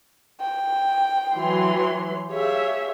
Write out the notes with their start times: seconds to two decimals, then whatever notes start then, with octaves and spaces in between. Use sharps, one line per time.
0.41 G5
1.36 E3 F#3 C6
2.31 G4 G#4 C#5 E5 F5